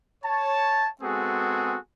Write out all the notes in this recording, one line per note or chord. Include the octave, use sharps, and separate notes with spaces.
C#5 A5
G#3 B3 C4 F#4 G#4 A4